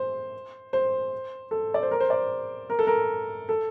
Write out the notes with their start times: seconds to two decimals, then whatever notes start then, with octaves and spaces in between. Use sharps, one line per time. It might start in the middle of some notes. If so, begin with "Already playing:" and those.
Already playing: C5
0.73 C5
1.51 A4
1.74 D5
1.83 C5
1.91 A#4
2.00 C5
2.10 D5
2.70 A#4
2.79 A4
2.87 A#4
3.49 A4